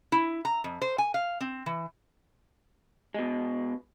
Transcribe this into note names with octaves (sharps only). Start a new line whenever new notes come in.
E4
A#5
F2
C5
G#5
F5
C4
E3
B2 G#3